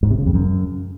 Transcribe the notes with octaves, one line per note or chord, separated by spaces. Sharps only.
G#2
C3
C#3
F2
F#2